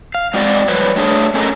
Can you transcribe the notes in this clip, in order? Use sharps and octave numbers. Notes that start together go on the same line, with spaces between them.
F5
G#3 C4 F#4 D5 D#5
F3 G3 B4 C#5
A3 D4 G#4 C#5
A3 C#4 A4 A#4 D#5